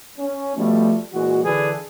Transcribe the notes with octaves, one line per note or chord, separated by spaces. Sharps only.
C#4
B2 F3 G3 A3
A#2 E3 G#3 F#4
D3 E3 D4 G#4 A4 B4